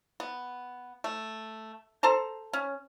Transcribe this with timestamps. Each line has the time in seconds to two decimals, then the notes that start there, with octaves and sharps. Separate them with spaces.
0.20 B3
1.04 A3
2.03 A4 C5 A5 A#5
2.53 C#4